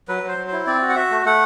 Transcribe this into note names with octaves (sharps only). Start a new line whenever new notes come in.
F#3 B4
F#3 C5
F#3
C5
E4
C4 D5
F#4
F#5
F#4 E5
A3
A3 F#5